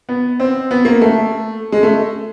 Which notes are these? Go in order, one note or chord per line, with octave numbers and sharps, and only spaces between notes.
B3
C4
B3
A#3
A3
G#3
A3